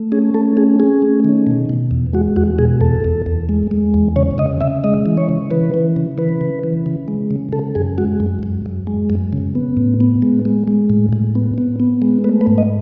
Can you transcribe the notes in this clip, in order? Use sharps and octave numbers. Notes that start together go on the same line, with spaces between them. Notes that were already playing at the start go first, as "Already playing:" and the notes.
Already playing: A3
C#4 G#4
A3 A4
C#4 G#4
C#4 G#4
A3
D#3
B2
B2
E2
G#3 F#4
E2 F#4
B2 G#4
E2 A4
E2
E2
G#3
G#3
E2
C#3 C#5
C#3 D#5
C#3 E5
G#3 D#5
E3
C#5
C#3
E3 B4
E3
C#3
E3 B4
C#3
E3
C#3
G#3
C#3
C#3 A4
F#2 G#4
G#3 F#4
F#2
F#2
F#2
G#3
F#2
C#3
B3
A2
B3
G#3
G#3
G#3
A2
A2
B3
B3
B3
G#3
A3 B4
B4
G#2
D#5